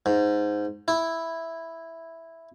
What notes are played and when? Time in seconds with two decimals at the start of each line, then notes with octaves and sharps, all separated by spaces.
0.06 G#2
0.88 E4